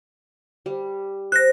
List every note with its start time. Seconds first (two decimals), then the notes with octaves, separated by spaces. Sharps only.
0.66 G3
1.32 C5 F#6 A#6